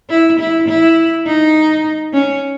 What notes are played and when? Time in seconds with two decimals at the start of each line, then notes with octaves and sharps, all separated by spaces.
0.10 E4
0.39 E4
0.68 E4
1.27 D#4
2.14 C#4